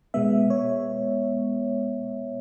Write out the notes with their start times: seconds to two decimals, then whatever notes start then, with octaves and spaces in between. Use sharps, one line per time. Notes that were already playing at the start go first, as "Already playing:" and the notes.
0.14 B2 G#3 B3 E5
0.50 C#5